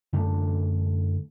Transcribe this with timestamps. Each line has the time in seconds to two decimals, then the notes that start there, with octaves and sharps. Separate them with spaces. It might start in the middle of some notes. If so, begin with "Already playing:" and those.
0.13 F#2 D3 A3 D4